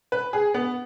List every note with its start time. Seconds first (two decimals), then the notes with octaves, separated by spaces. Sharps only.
0.12 B4
0.33 G#4
0.54 B3